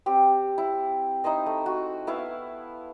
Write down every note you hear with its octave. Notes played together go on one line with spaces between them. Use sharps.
C4 G4
E4
D#4 E4 C5 D#5
A3
F#4
B3 E4 E5 F5